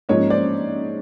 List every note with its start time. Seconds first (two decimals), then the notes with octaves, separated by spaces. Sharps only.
0.09 G#2 F3 A#3 C#4 C#5 D#5
0.30 C5 D5